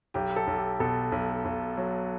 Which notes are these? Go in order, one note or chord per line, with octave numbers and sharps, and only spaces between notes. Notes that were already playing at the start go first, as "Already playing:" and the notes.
B1 G4
A4
B1
G4
B2 A4
B1
B1
F#3